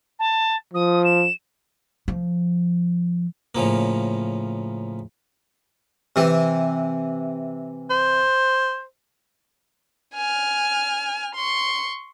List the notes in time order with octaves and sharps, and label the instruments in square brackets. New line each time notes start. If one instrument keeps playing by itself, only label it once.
[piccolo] A5
[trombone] F3 [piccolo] D#6
[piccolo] E7
[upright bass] F3
[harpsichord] A2 C#3 F3 A#3
C3 E3
[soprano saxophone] C5
[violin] G#5 F6
C6 C#6